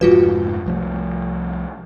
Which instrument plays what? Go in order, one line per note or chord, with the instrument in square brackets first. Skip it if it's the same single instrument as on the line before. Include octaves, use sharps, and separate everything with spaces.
[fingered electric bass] F1 G#2 F3 [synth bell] F4 F#4 B4
[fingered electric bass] C2 F3 A3